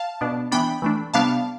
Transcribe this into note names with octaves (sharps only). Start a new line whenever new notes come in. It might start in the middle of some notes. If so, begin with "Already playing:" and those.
Already playing: F5 A5
B2 B3 D4
E3 B3 D4 G5 B5
E3 A3 D4
C3 G3 B3 D4 F5 A5